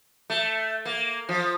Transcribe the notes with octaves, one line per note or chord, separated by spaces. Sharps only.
A3
A#3
F3